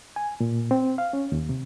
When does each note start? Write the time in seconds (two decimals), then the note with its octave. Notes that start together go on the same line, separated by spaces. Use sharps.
0.16 G#5
0.40 A#2
0.71 C4
0.98 F5
1.13 C#4
1.32 D#2
1.49 C3